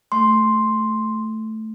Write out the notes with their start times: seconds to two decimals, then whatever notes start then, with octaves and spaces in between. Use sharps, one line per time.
0.12 A3 C6